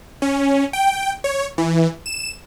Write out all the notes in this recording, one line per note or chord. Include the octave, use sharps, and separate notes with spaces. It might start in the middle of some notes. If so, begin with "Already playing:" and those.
C#4
G5
C#5
E3
E7